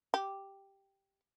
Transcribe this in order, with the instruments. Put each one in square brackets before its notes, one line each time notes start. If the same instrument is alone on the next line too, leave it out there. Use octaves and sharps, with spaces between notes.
[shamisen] G4